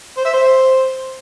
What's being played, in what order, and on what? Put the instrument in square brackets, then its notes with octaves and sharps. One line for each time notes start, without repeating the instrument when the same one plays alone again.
[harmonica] C5
E5
C5